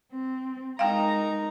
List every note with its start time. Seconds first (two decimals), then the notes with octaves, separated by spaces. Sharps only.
0.12 C4
0.79 G#3 D#4 A#4 F5 G5 A#5